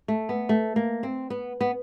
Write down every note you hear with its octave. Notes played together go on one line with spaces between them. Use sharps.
A3
B3
A3
A#3
C4
B3
B3